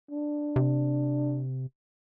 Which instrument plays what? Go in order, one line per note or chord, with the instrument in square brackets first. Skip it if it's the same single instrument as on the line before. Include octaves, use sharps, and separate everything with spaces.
[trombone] D4
[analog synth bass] C3